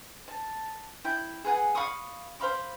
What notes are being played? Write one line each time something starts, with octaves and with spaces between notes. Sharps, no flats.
A5
E4 G5
G#4 B4 F#5 G#5
F5 B5 C#6 D#6
C5 F5 B5 D6